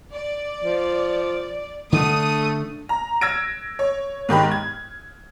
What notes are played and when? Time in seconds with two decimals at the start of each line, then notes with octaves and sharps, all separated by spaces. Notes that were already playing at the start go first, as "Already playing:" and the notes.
0.13 D5
0.64 F3
1.92 D3 A3 D4 D#6
2.89 A#5
3.21 E6 G#6 A#6 D7
3.79 C#5
4.29 G#2 D#3 G4 B5
4.51 G#6